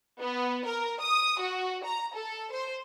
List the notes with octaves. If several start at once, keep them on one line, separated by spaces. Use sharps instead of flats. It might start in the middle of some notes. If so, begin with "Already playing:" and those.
B3
A#4
D#6
F#4
A#5
A4
C5